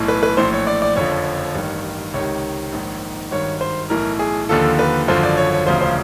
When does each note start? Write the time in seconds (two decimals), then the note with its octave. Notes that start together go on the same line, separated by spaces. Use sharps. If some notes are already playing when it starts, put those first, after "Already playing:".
Already playing: B1 A2 E3
0.08 B4
0.23 B4
0.37 A#1 A2 E3 C5
0.53 C#5
0.67 D5
0.82 D5
0.96 F#1 F2 D3 F3 C#5
1.55 A1 G2 D#3
2.14 C#2 C3 D#3 C#5
2.73 A#1 G#2 D#3
3.31 G#1 G2 D#3 C#5
3.61 C5
3.90 B1 A2 E3 A#4
4.19 G#4
4.49 D#2 D3 F3 A4
4.79 B4
5.08 G#1 F#2 D3 F3 C5
5.23 D5
5.38 C#5
5.52 C#5
5.66 E1 D2 C#3 F3 C5
5.81 C5